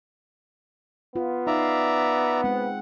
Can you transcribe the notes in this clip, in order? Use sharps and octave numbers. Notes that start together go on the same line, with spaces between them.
B3 F4
D#4 D5 E5 F5 A#5
G#3 C4 F#5